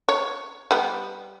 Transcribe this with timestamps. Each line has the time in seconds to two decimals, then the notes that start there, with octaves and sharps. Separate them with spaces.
0.09 C#5
0.71 G3 B3